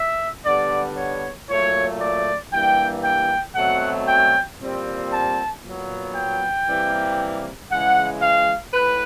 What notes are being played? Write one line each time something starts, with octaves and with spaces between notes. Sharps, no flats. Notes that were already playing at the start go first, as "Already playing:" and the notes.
Already playing: E5
D3 G3 B3 D5
C#5
A#2 F#3 A3 C#5
D5
G2 E3 G3 A#3 G5
G5
B2 F#3 A3 C4 F#5
G5
A#2 G3 C4
A5
A#2 F#3 B3
G5
C3 E3 G3 A#3
C#3 E3 G#3 F#5
F5
A2 B4